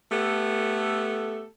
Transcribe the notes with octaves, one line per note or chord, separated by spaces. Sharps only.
A3 B3 G4 A4